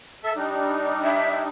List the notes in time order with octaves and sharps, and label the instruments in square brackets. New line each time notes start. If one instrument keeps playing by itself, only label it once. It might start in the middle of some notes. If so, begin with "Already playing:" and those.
[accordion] A4 E5
G3 D4 D#4
[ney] E5